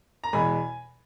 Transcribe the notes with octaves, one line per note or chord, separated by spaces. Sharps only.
A#5
E2 B2 G#3 G#5 B5